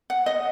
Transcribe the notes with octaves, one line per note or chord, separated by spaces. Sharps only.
F#5
D#5